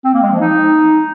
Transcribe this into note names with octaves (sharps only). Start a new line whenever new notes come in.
C4
A#3
G#3
F3
D#4